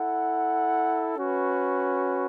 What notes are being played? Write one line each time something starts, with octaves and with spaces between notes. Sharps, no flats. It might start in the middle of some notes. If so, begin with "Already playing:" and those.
Already playing: E4 A4 F#5
C#4 F#4 B4